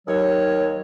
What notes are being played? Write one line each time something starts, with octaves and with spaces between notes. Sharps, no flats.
D#2 F#3 C#5